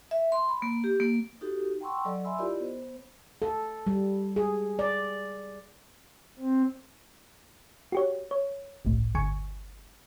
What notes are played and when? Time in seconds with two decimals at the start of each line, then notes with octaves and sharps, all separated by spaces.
0.11 E5
0.32 C6
0.49 B5
0.62 A#3
0.84 G4
1.00 A#3
1.41 D#4 F#4 G4 A4
1.81 F#5 G5 A#5 C6 C#6 E6
2.05 F#3 A4 D5 D#5 F#5
2.24 E5 G#5 B5 C6 E6
2.38 E4 F4 G4 A#4 D5 D#5
2.60 B3 C5
3.42 A4
3.87 G3
4.36 G#4
4.79 D5
6.39 C4
7.92 F#4 G4 C#5
8.31 C#5
8.85 G1 C2 A2
9.15 G1 D2 G#5 C#6